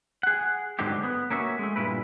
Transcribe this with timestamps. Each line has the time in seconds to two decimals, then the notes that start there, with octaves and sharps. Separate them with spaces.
0.23 G#4 F#5
0.79 G#2 D3 F#3 G#3 G4
1.03 B3
1.30 A#3 C#4 F#4 E5
1.59 G#3 A3
1.76 G2 A#2 E4 B4